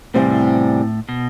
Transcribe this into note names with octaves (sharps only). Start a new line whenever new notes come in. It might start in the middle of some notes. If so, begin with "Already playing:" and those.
E2 A2 C3 G3 C4
B2